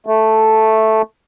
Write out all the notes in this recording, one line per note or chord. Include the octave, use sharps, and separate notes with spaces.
A3